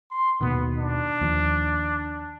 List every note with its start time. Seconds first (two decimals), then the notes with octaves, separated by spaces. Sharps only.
0.11 C6
0.41 D#2 B2 D#3 B3
0.78 D4
1.21 D#2 F3